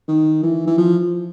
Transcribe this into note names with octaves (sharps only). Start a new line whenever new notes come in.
D#3
E3
E3
F3